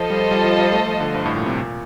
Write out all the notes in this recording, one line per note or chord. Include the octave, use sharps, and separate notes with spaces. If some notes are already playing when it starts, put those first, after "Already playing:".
Already playing: F3 F4 A4 C5 D#5 A5
G3
G3
F3
G3
A3
F3
D3
G2
A2
A#2
C3
A#2